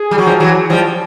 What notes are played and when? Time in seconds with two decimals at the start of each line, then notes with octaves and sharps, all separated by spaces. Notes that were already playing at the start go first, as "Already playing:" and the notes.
Already playing: G#4
0.11 G3
0.18 F#3
0.26 F3 G3
0.40 E3 F#3
0.70 F3 G3